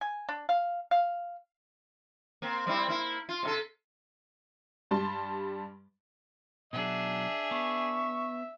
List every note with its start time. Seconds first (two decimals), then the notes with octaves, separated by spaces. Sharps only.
0.01 G#5
0.29 D4
0.49 F5
0.91 F5
2.42 A#3 C4
2.67 G3 C4 E4
2.88 A#3 E4
3.29 F4
3.43 C3 D#4 A4
4.91 G2 G3 A5 C6
6.73 B2 F#3 D4 G#4 E5
7.51 B3 C#6